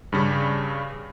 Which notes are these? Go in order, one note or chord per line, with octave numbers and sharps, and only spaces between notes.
G2 C#3 G3